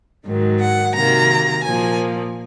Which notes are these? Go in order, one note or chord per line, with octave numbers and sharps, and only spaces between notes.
G#2 D#3 F#3
F#5
C3 D#3 F#3 A#3 A#5
A#2 F3 A#3 G#5